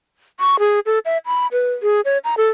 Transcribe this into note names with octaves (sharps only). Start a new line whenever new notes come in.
C#6
G#4
A4
E5
B5
B4
G#4
C#5
A#5
A4